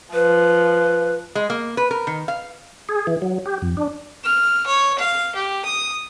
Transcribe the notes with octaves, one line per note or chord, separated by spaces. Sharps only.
F3 B4
G#3
A#3
B4
A#4
D#3
F5
G#4
E3
F#3
G4
F2
D4
F6
C#5
F5
G4
D#6